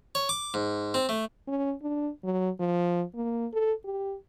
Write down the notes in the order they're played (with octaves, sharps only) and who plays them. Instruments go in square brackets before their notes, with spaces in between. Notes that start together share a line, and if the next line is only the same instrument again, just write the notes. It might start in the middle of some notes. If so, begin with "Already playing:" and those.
[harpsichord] C#5
D6
G#2
C4
A3
[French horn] C#4
D4
F#3
F3
A#3
A4
G4